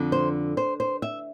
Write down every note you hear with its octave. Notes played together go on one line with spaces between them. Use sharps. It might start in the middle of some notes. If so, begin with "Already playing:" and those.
Already playing: F2 D3
C5
C5
C5
E5